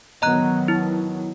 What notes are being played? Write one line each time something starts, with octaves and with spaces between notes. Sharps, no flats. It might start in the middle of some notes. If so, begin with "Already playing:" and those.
D#3 F#3 B3 D#5 A#5 F#6
E4